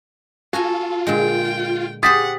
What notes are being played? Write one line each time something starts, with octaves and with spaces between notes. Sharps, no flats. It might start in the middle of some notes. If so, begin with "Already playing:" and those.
F4 F#4 A4 G#5 A#5
A#2 D3 G#3 G5
G4 G#4 C5 F#5 D#6 A6 B6